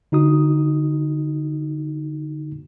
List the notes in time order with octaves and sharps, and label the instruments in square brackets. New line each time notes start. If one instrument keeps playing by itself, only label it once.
[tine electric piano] D3 D#4 F#4 D#6